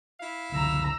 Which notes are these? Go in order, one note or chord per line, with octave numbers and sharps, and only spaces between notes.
E4 F5
F#1 C#2 D3 A#5 E6